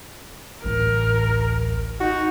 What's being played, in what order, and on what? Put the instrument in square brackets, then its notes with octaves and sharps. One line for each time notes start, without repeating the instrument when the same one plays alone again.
[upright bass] A1 D2 [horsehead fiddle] A#4
[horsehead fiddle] D#4 [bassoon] F#4